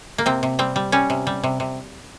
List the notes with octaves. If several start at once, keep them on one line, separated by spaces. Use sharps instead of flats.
A#3
C3 C4
C3
G3 C4
G3
G3 C#4
C3
G3
C3
C3